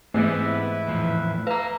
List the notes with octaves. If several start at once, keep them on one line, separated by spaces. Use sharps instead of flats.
G#2 E3 A3 B3 C4 E4 B4 E5
E2 A2 F3
B4 E5 F5 A#5